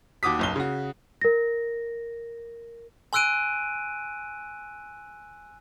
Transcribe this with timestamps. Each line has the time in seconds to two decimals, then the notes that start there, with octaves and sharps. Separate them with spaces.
0.23 D#2 F#4 D6 D#6 B6
0.39 F#1 B1 G7
0.56 C#3 F#4
1.21 A#4 A#6
3.13 G#5 C6 E6 F#6 D7 D#7